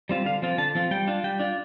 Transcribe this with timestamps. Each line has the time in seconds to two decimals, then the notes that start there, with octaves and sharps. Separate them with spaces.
0.09 G3 C4 F4
0.25 D3 F5
0.42 F3 C4 F4
0.58 D3 A5
0.75 F3 C4 F4
0.91 G3 G5
1.07 D4 F4
1.24 G3 G5
1.39 D4 F4